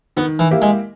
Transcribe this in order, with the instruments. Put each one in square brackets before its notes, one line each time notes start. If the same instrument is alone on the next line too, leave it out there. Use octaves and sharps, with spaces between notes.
[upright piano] D#3 [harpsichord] B3
[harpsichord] E3
[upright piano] A#3 E4 G4
[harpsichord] G#3